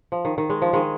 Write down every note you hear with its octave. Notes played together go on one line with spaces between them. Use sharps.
F3
D#3
D#3
G#3
F3
D#3 G#3